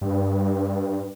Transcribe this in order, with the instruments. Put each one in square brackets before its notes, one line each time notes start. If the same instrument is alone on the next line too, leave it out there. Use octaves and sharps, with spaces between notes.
[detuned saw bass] G2